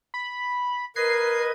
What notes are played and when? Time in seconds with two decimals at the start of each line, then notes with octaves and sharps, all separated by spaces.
0.14 B5
0.96 A#4 B4 D#5 G#6 C7